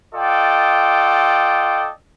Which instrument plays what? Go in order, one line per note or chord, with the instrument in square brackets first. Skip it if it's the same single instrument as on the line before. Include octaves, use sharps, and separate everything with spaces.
[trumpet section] F4 A4 D5 D#5 G5